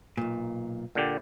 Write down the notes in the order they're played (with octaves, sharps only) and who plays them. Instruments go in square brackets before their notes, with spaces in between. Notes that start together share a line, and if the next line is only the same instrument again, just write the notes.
[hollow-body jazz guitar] B1 A#2
[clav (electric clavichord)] A#2 D3 G4